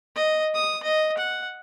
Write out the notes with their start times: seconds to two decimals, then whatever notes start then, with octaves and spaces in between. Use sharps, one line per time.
0.16 D#5
0.55 D#6
0.83 D#5
1.18 F#5